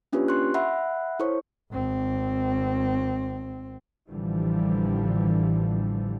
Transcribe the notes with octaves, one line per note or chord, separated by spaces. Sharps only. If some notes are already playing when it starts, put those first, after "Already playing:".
A#3 C#4 D4 F4 G4 B4
C6 C#6 F#6
E5 F#5 B5 F#6
E4 A4 C5 C#5 C#6
G#1 C4
A1 D3 E3 F3 G3